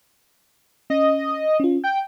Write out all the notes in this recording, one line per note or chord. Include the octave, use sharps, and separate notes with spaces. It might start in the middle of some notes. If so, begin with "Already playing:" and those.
C#4 D#5
C#4 F4
G5 G6